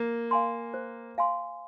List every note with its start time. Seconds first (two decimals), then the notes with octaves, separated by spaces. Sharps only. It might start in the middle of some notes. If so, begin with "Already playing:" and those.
Already playing: A#3
0.31 F5 G#5 C6
0.74 C5
1.18 F5 G#5 C6